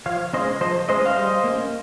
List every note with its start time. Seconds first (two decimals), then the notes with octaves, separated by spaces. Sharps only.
0.06 F3 C#5 F5
0.33 G#3 C#4 C5 D#5
0.61 F3 C5 D#5
0.89 G#3 C#4 C5 D#5
1.06 F5
1.16 G3 C5 D#5
1.44 A#3 C#4